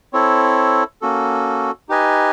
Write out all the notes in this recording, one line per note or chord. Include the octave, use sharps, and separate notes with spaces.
C4 E4 A4 C#5
A#3 C#4 F#4 A4
D#4 G4 B4 D#5 G#5